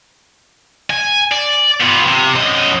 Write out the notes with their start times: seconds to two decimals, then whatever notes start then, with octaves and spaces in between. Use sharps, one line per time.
0.90 G#5
1.32 D5
1.80 B3 F4
2.07 C3
2.35 F#2 D#5